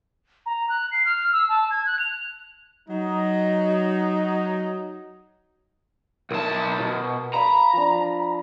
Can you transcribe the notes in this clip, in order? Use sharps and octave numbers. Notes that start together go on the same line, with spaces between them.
A#5
F#6
C7
F6
E6
A5
G#6
F#6
F7
F#3 D#4
B1 A#4 E5 A5
B2
F5 A#5 B5 C#6
F3 D4